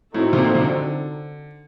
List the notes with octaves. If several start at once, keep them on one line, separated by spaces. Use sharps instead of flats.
A2 C4 D#4 F#4 A4
C3
A#2
C3
D3